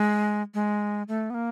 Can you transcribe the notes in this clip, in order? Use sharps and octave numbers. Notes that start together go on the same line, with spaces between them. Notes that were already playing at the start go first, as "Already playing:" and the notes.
Already playing: G#3
G#3
A3
B3
A#3